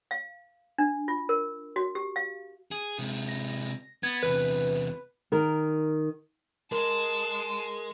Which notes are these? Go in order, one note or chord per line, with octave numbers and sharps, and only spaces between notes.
F5
D4
F4
A#4
F#4
G4
F5
G#4
C3 G#3
A#6
B3 G#6 A6
E2 C3 B4
D#3 A#4
G#3 A#4 A5